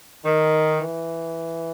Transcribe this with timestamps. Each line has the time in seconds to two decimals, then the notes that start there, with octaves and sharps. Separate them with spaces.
0.24 D#3
0.78 E3